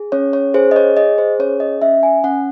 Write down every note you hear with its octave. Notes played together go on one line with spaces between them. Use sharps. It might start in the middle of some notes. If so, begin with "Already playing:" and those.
Already playing: G#4
C#4 C#5
C#5
G#4 C5
D#5
C#5
G#4 D#5
C5
C#4 C#5
D#5
C#4 E5
G#5
C#4 F#5